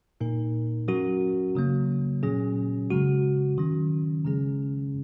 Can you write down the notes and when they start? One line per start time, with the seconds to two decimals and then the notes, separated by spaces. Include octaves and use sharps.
0.20 A#2 A#3 D#4 A#4
0.88 F#3 C#4 F#4 A#4
1.55 C#3 F#3 A#3
2.23 A#2 F#3 C#4 G#4
2.90 C#3 G#3 F#4
3.58 D#3 F#3 C#4
4.25 C#3 G#3 C#4 G#4